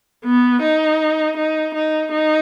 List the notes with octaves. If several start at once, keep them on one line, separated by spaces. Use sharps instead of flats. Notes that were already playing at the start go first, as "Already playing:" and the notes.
B3
D#4
D#4
D#4
D#4